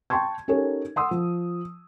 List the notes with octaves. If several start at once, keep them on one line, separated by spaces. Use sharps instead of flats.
G5 A5 C6 C#6 G#6
C#4 D#4 G4 A4 A#4 C#5
F#5 C6 D#6 E6
F3